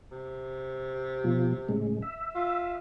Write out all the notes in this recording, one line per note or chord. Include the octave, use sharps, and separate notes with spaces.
C3
B2 F3
A2 C#3 G#3
E5
F4